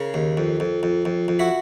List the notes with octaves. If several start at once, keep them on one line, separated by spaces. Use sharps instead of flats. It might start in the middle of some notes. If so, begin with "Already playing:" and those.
Already playing: C#3 G#4 A#4
D#2
F2
F2
F2
F2
F2
E4 F#4